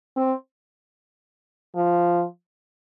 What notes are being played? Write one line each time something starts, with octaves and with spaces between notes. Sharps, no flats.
C4
F3